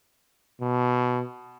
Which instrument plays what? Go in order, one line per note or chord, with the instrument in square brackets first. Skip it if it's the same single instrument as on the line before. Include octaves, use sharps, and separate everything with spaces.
[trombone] B2